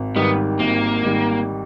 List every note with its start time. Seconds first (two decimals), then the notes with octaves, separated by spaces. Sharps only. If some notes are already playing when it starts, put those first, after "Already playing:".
Already playing: G#1
0.15 G#2 D#3 G3 B3
0.59 G#1 A#3
1.03 G#2 D#3 G3